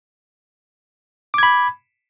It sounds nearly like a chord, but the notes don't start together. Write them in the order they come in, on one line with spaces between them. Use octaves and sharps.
D6 G#6 B5